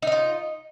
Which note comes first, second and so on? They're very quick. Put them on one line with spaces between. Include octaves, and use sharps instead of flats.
D#4 D#5 F4